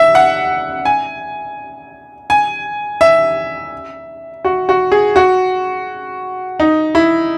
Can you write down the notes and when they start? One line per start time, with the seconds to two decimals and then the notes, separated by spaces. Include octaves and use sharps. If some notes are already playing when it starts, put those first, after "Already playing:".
Already playing: E5
0.15 F#5
0.85 G#5
2.30 G#5
3.01 E5
4.45 F#4
4.69 F#4
4.92 G#4
5.16 F#4
6.60 D#4
6.95 E4